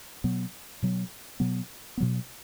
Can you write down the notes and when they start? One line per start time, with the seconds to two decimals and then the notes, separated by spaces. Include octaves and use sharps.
0.24 B2 F#3 B3
0.83 B2 F#3 B3
1.40 B2 F#3 B3
1.97 B2 F#3 B3